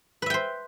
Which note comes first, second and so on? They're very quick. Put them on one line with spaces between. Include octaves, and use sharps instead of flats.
B4 E5 G5 C5